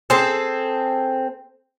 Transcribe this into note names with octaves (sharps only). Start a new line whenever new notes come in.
C4 G#4 A4 C5